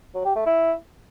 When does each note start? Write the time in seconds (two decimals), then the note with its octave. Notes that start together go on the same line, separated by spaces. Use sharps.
0.14 F#3
0.25 G4
0.36 A3
0.46 E4